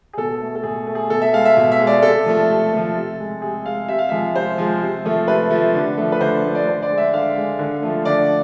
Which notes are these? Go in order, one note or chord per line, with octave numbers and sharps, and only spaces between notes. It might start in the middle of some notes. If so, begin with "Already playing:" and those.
G#4
B2 A4
A3
A4
B2 G#4
A3
G#4
B2 A4
E5
G#3 F5
E5
B2
E5
G#3
D5
C3 A4
F3 A3
C3
F3 A3
C3
G#3
C3 G#4
G#3 F5
C3 E5
F5
F3 G#3 E5
C3 C5
F3 G#3
C3
F3 A3
C3 B4
F3 A3
D3
F3 A3
B4
D3 C5
F3 A3
D5
D3 C5
D5
G#3
E5
D3 F5
G#3
D3
F3 A3
D3 D5